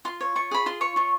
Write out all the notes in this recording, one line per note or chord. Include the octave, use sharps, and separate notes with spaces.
F4 C6
C#5
F4 C#6
G#4 B5
F4 C6
C#5 C#6
F4 C#6